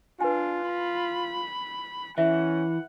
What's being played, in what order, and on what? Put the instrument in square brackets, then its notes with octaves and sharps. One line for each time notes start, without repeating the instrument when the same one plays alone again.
[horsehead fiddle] D4 [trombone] F4 [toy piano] B4 G#5
[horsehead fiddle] B5
[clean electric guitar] E3 [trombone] C#4 [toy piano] E5 [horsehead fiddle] F#5